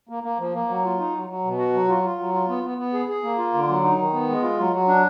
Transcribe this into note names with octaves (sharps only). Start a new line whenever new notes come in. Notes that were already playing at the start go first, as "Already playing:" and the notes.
A#3
A#3
F3
A#3
F#3
F4
D#4
F#3
F#3
B2
F#4
F#3
F4
F4
F#3
F4
B3
B3
B3
G#4
G#4
A#3
F4
D3
F#3
D#4
D#3
B3
G#3
F4
F#3
F#3
D4